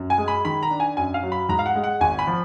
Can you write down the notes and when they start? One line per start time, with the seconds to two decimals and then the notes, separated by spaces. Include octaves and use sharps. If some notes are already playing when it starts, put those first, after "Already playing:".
Already playing: F#2
0.10 G#5
0.18 G#3
0.28 B5
0.45 D#3 B5
0.63 A#5
0.71 D4
0.80 G#5
0.97 F#2 G#5
1.14 F5
1.23 F#3
1.32 B5
1.49 G#2 A#5
1.59 F5
1.66 F#5
1.76 G#3
1.84 F#5
2.01 G#1 G#5
2.19 B5
2.27 F3